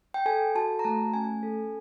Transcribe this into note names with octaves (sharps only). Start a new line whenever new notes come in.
G5
A4 G#5
F#4 A5
A#5
A3 A5
C#4 G#5
A4